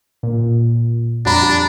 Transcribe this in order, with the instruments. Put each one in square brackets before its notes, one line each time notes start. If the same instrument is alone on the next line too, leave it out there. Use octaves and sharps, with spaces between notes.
[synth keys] A#2
[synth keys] F2 [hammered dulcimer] G3 A#5 B5 [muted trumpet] D4